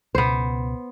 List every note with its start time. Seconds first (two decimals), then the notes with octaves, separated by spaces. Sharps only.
0.15 C#2 B2 B3 C5